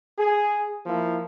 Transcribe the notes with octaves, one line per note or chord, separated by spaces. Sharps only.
G#4
F3 A#3 E4